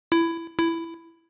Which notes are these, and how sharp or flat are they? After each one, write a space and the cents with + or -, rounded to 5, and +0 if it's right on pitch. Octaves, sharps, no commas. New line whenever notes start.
E4 +15
E4 +10